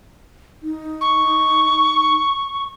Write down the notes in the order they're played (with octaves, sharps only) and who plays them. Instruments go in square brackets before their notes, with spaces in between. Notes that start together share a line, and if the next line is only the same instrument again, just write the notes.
[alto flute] D#4
[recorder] C#6